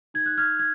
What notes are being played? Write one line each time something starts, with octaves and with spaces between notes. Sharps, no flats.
D#4 G#6
F#6
F6 G#6
G#6